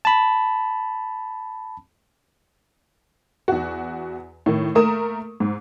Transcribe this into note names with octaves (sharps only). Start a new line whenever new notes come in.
A5 B5
E2 F#4
A2 D#3
A3 A#3 A#4 D#6 E7
G#2